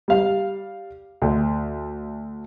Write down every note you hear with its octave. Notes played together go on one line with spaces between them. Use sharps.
G3 F5
D2